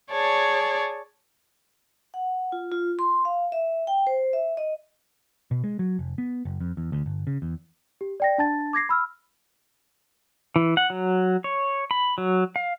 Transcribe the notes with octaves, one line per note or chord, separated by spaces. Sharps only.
G#4 C#5 D5 A5
F#5
F4
F4
C6
F5
E5
G5
C5
E5
D#5
B2
G#3
F#3
F1
B3
F#1
F2
E2
D2
G1
C#3
E2
G4
D5 G5 A#6
D4 A5 A6
D6 G#6 A#6 C7
B5 E6 F6
E3
F#5
F#3
C#5
B5
F#3
F5